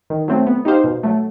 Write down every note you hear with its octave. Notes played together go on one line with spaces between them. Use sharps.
D#3
F#3 A3 C4
B3
D#4 G4 C5 F5
B2
F#3 A3